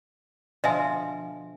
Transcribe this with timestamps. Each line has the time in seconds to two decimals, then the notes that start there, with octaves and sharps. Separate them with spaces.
0.64 B2 D3 F3 D#5 E5 G#5